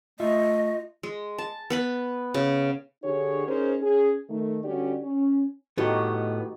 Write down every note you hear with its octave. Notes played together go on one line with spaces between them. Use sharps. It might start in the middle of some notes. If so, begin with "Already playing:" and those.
A3 F4 D#5 E5
G#3
A5
B3 B4 B5
C#3
D3 D4 G4 G#4 C#5
C#4 D#4 G#4 A#4 C5
C#4 G#4
D#3 A3
D3 G3 C#4 F#4 G4 D5
C#4
A2 A3 B3 D#4 F#4 G4